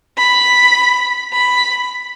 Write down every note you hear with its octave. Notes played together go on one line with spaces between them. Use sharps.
B5
B5